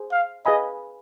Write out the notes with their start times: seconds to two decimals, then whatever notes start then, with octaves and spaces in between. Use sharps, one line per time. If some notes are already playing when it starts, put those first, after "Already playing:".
Already playing: G#4 C5
0.12 F5
0.46 G#4 B4 D#5 F5 G#5 B5